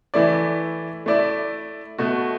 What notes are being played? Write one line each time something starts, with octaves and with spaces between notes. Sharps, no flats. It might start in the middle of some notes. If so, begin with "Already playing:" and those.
E3 A3 E4 D5
A3 E4 D5
B2 A3 F#4